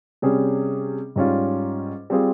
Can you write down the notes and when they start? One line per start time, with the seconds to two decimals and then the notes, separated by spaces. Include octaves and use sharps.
0.22 C3 G3 C#4 G#4
1.16 G#2 G3 C#4 F4
2.10 G3 C4 F4 G#4